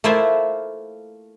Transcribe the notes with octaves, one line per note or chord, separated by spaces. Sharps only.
A3 A#3 E4 F4 C5 E5